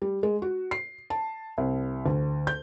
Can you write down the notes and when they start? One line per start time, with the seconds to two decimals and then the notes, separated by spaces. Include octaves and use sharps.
0.02 G3
0.23 G#3
0.42 F#4
0.71 C7
1.10 A5
1.58 C2
2.06 D2
2.47 G6